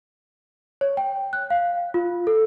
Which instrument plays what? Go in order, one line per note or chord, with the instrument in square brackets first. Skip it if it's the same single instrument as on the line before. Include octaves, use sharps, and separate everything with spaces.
[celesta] C#5
G5
F#6
F5
F4
A4